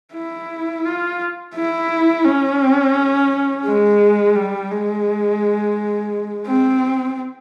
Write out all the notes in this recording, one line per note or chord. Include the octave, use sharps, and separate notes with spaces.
E4
F4
E4
C#4
G#3
G3
G#3
C4